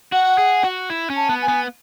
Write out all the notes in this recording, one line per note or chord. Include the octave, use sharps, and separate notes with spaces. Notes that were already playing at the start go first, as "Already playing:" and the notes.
F#4 F#5
G#4
F#4
E4
C#4
A5
B3
G#5
B3